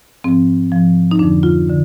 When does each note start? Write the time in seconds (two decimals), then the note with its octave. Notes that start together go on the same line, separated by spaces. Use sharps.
0.24 G#2 F3 C4
0.72 G#2 F3
1.11 D#4
1.19 F2 D3 F3 D4
1.43 F4
1.69 D3